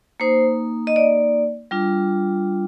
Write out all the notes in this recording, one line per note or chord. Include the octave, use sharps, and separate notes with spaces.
A#3 D#4 C5
D#5
D5
G3 D4 F4